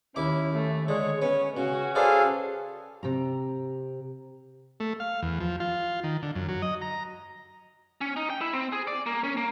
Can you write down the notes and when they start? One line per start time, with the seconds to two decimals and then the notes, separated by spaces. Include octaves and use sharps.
0.16 D#2 C#4 E4 D6
0.54 A3
0.88 D3 G#3 C#5
1.22 B3 C#4 C#5
1.57 C#3 C#4 F#4
1.95 G#4 A4 B4 C5 D5 F5
3.03 C3 G4 A#5
4.80 A3
5.00 F5
5.23 E2
5.40 F3
5.60 F4
6.04 D#3
6.22 D3
6.35 F#2
6.48 F#3
6.62 D#5
6.82 A#5
8.01 C#4
8.16 D#4
8.30 G5
8.41 E4
8.53 C4
8.72 G#4
8.87 D5
9.06 A#3
9.24 C#4
9.37 A#3